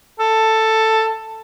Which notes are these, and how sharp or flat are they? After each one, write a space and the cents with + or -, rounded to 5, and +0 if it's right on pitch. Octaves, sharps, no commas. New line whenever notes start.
A4 +10